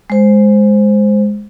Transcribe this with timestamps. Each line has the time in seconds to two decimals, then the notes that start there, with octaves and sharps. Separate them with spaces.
0.10 G#3 C5